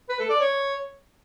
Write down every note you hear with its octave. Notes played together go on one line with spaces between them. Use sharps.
B4
A4
D5
C#5